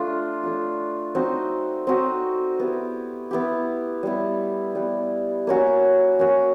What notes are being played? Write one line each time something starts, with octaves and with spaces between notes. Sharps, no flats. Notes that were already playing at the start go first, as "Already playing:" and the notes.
Already playing: A3 D4 F4
A3 D4 F4
C4 D#4 F#4
C4 D#4 F#4
B3 E4 G4
B3 E4 G4
G3 B3 E4
G3 B3 E4
A#3 C#4 F#4
A#3 C#4 F#4